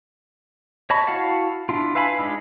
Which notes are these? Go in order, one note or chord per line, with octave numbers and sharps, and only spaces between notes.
C#5 D#5 A5 B5 C#6
E4 F#4 F5 F#5 A5
D4 E4 F4
B4 E5 F5 G#5 B5
G#3 D4 D#4 F4